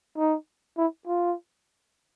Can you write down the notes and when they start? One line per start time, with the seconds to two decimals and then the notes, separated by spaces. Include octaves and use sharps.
0.18 D#4
0.77 E4
1.07 F4